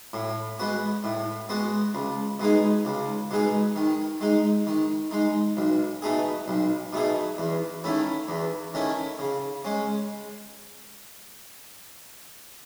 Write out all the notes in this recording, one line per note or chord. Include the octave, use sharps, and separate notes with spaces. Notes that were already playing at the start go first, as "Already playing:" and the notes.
A2
G#3 B3 F#4
A2
G#3 B3 F#4
C#2
B2 G#3 D#4 G#4
C#2
B2 G#3 D#4 G#4
D#3
G#3 D#4
D#3
G#3 D#4
B1
B2 A3 D#4 G#4
B1
B2 A3 D#4 G#4
E2
D#3 A3 C#4 E4
E2
D#3 A3 C#4 E4
C#3
G#3 C#4